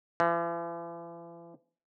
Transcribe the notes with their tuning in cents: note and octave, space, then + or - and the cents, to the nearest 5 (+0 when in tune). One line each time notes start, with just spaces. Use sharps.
E3 +45